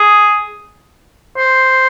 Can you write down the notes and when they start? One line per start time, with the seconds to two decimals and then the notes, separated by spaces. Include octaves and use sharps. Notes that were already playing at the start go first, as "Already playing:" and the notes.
Already playing: G#4
1.38 C5